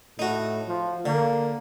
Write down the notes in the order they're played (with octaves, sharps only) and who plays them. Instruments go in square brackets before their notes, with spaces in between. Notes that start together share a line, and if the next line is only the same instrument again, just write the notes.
[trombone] A2 [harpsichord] D#4 F#4
[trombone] F3
[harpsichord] D3 [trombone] A#3